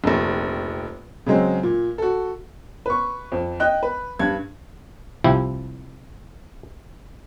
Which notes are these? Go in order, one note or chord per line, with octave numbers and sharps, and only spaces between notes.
F1 A#1
C#3 F#3 G#3 C4
A#2
F#4 A4
B4 C#6
F2
D#5 G5 F#6
B4
G2 G#6
C2 F3 E4 G4